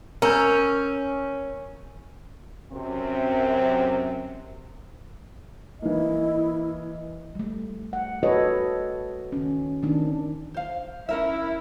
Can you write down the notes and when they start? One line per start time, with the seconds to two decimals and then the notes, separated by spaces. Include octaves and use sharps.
0.22 C#4 A#4 A#5 E6 G6
2.72 F#2 C3 C4
5.82 E3 A#3 E4 D#5
7.35 G3 A3
7.93 F#5
8.23 F#4 A4 B4 C#5 D#5
9.32 D#3 C#4
9.83 D#3 A3 C4 D4
10.54 C5 F5
11.09 C#4 E4 A#4 E5